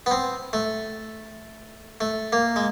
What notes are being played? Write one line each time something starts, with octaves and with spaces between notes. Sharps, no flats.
B3
C4
A3
A3
A#3
G#3